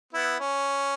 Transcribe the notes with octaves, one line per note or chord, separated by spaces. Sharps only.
B3 E4
C#4